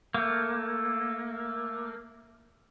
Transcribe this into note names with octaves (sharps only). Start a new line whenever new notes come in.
A3 A#3